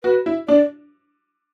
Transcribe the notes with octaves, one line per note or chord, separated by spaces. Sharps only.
F#4 B4
E4
D4 D5